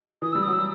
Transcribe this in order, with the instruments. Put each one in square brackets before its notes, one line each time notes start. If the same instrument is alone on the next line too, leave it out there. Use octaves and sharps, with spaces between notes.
[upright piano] E3 [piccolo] D#6
[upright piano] G3 [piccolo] E6
[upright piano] F#3 [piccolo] D#6
[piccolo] E6